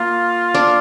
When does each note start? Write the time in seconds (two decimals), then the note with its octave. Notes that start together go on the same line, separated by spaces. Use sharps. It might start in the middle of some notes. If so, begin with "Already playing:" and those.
Already playing: A#3 F4
0.55 D4